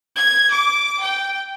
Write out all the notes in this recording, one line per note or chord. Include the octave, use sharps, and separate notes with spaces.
G#6
D6
G5